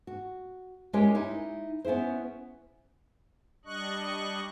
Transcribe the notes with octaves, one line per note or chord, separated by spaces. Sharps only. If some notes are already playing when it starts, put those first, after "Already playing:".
F#4
G#3 C#4 E4 G4 A#4 C#5
D#4 E4
B3 C#4 E4 G#4 C5
G3 D4 D#5 C#6 F#6